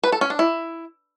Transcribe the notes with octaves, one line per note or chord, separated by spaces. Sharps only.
B4
A4
C#4
D4
E4